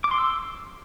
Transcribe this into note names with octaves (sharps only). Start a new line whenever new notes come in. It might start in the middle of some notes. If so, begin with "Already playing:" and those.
D6
C6
E6